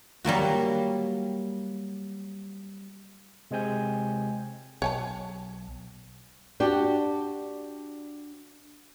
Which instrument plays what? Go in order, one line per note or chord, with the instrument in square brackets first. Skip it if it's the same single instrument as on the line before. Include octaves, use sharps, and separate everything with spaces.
[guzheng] F#3 G3 A#3 F#4
[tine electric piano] C3 G#3 C4 G#5 G6
[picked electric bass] B1 [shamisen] C#5 G#5 A5
[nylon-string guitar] D4 F#4 G4